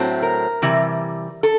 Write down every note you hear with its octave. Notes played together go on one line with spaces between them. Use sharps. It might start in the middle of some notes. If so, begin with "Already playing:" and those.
Already playing: A2 F#3 A3 C4
A#4
C3 E3 G3
A4